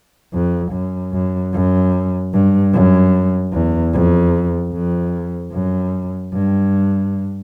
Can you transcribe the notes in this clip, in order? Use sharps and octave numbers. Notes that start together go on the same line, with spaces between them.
F2
F#2
F#2
F#2
G2
F#2
E2
F2
F2
F#2
G2